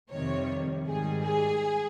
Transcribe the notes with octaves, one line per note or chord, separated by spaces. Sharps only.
F2 C3 D#3 G3 C#5
G#2 D#3 G3 G#4
G#4